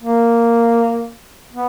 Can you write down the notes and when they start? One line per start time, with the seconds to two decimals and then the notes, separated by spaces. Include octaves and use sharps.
0.02 A#3
1.53 B3